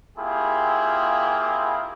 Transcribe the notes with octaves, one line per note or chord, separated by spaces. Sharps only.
A#3 C4 E4 F4 G4 G#4